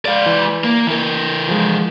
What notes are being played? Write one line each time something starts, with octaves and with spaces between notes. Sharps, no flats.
G#3 D5 F5 A6
E3
A#3
E3 E4 A#4
F3 G#3